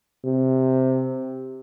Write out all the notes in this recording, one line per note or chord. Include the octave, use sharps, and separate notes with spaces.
C3